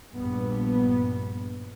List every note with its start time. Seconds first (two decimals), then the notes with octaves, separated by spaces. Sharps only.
0.14 A#1 G2 B3